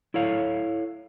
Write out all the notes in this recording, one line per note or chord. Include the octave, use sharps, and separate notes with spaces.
E4 A4 C#5 F5